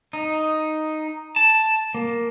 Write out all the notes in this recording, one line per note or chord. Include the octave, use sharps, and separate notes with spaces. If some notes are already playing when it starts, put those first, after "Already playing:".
D#4
A5
A#3